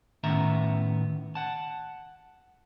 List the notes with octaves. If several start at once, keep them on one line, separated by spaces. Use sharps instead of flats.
A2 D#3 B3 C#4 E5 A#5
F#5 A5